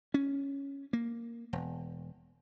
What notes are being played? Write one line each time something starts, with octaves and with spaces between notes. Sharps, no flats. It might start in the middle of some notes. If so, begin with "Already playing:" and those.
C#4
A#3
E1